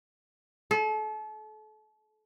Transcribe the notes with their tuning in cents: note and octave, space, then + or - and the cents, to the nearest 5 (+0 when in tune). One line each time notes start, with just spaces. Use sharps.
A4 -35